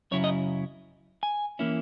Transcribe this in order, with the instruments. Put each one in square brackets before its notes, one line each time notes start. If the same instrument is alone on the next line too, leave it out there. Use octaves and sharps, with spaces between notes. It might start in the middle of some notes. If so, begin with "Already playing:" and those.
[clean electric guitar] F#2 C#3 F#3 C#4 E4 C#5
D#5
G#5
E3 A#3 C#4 E4